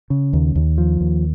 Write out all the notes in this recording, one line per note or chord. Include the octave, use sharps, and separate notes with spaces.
C#3
D#2
D#2
F3
D#2